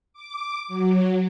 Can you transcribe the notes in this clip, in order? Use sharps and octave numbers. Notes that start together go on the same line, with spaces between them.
D6
F#3